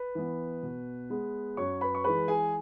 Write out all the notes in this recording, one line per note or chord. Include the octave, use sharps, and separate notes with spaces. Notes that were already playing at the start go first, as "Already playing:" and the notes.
Already playing: B4
E3 B3
B2
G#3 B3
F#2 C#5 C#6
B4 B5
C#6
E3 G#3 B4 B5
G#4 G#5